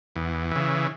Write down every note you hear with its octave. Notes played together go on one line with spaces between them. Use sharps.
E2
C#3 E3